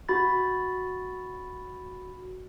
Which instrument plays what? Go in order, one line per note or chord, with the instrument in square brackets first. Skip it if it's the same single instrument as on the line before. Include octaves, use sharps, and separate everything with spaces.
[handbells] F#4 B5 A6